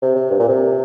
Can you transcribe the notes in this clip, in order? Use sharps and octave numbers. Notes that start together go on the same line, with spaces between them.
C3
C3
G2
A#2
C3